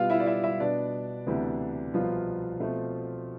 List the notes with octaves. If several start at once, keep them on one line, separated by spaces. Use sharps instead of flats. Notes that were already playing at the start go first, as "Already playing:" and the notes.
Already playing: B2 G3 B3 F4 F5
E4 E5
D5
E4 E5
E4 E5
B2 B3 D4 D5
D2 C3 E3 B3
C2 B2 F3 B3 F4
B2 A3 C4